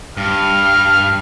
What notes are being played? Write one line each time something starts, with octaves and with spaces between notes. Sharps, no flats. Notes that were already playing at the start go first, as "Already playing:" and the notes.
G2 F6